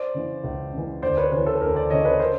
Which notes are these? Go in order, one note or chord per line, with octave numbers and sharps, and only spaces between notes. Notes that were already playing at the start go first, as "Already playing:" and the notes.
Already playing: C5 D5
C#3 E3
C#2
C#3 E3
D2 C5 D5
B4 C#5
C#3 E3 B4 C#5
A4 B4
D2 A#4 C5
C5 D5
C#3 E3 C#5 D#5
B4 C#5
A#4 C5